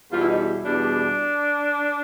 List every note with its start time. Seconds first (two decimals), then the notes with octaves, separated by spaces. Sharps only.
0.11 E2 B2 G3 F4
0.20 E4
0.29 D#4
0.39 E4
0.64 E2 B2 G3 D4